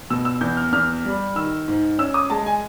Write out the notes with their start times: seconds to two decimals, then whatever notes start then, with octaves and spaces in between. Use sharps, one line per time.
0.10 B2 E6
0.25 E6
0.41 E2 G6
0.57 F6
0.73 E2 F6
1.05 G3
1.35 D#3 E6
1.68 G#2
1.98 C#4 E6
2.14 D#6
2.30 G#3 A5
2.46 G#5